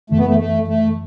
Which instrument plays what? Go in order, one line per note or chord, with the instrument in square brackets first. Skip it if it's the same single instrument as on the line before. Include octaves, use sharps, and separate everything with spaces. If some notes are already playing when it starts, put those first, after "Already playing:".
[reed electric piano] F#2 C#3 E3 [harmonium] A3
[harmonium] B3
A3
A3
A3